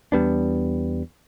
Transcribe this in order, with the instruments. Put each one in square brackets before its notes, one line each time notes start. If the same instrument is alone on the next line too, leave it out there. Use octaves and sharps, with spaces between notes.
[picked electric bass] E2 G3 B3 D4